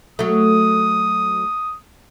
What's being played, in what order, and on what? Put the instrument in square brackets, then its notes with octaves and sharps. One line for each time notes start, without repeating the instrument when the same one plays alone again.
[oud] F#3 A3 [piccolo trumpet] D#6